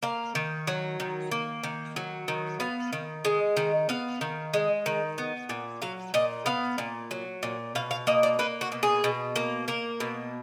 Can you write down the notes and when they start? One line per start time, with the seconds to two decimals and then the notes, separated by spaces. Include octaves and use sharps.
0.03 A#3 F5
0.35 D#3
0.67 F#3
1.00 D#3
1.32 A#3
1.63 D#3
1.96 F#3
2.28 D#3
2.60 B3 F5
2.93 D#3
3.25 G#3
3.57 D#3
3.89 B3 F5
4.21 D#3
4.54 G#3
4.86 D#3
5.18 B3
5.49 A#2
5.82 F#3 F5
6.14 A#2 D#5
6.46 B3 F5
6.78 A#2
7.11 F#3
7.43 A#2
7.75 B2 F5
7.91 F5
8.07 A#3 D#5
8.23 D5
8.39 A#3 B4
8.61 F#4
8.72 B2
8.83 G#4
9.04 B2
9.36 A#3
9.68 A#3 A#4
10.00 B2